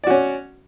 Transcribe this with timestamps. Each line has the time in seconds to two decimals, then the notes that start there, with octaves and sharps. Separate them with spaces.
0.04 D5
0.07 F#4
0.10 C#4